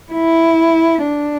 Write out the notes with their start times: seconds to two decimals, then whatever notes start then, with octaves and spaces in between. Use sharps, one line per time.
0.13 E4
1.05 D4